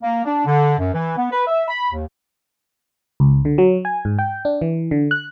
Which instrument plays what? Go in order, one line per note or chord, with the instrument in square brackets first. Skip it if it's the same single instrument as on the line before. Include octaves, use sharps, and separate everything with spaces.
[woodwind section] A#3
D4
D3
F#2
E3
B3
B4
E5
B5
D#2
[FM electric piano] C#2
D3
F#3
G#5
G#2
G5
D4
E3
D3
F#6